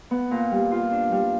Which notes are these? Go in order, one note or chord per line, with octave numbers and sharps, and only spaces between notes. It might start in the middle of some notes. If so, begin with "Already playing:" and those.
B3
A#2
G3
F4
D4
G3